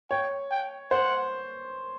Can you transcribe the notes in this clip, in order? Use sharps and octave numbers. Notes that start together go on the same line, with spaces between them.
C#5 G5
G5
C5 F#5